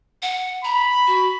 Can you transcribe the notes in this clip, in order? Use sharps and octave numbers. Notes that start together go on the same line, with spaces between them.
F#5
A#5 B5
F#4